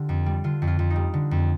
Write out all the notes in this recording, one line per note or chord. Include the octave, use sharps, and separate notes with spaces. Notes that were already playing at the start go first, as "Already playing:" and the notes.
Already playing: D3 F4 G4
F2
G3
D3 F4
F2
F4
F2
D#4
G3
D3
F2